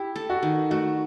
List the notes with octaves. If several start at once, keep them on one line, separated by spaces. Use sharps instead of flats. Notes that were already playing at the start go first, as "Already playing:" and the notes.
Already playing: E4 G4
A4
F#4
D#3
A3 F#4